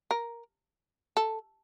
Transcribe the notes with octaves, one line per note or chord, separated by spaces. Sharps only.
A#4
A4